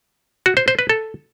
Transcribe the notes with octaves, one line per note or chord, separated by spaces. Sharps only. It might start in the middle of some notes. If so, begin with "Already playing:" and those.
F#4
C5
C5
B4
A4